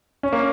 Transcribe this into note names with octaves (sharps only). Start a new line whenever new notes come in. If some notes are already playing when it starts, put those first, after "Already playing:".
C#4
A#3